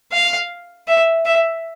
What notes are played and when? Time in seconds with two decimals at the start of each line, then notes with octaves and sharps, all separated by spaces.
0.13 F5
0.88 E5
1.25 E5